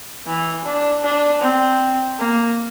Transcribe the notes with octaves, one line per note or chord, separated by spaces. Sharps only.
E3
D4
D4
C4
A#3